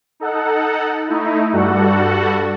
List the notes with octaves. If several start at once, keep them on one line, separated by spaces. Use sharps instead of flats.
D#4 A4 F#5
A3 D#4 E4
G2 G3 F#4 A4 F#5